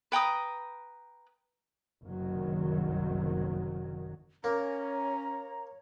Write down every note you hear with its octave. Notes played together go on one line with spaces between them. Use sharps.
B4 G5 A#5 D#6
F#1 C2 D#3 F#3
A#3 C#4 C#5 A#5